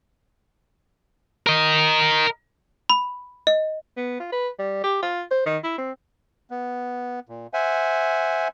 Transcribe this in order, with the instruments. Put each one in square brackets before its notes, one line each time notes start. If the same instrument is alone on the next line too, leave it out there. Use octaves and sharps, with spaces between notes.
[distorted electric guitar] A#4 D#5
[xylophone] B5
D#5
[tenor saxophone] B3
F4
B4
G3
G4
F4
C5
D#3
E4
C4
[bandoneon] B3
A#2
C5 E5 F#5 G#5